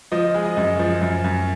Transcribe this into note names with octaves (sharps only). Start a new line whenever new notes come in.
F3 D#5
G#3
D#5
F#2
F3
F#2
F#2